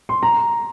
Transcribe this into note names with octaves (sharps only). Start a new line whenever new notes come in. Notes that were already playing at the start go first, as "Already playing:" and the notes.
C6
A#5